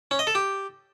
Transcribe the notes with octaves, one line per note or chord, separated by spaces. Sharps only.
C#4
D#5
A4
G4